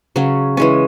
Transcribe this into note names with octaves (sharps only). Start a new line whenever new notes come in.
C#3 F#3 C#4
E3 G#3 C#4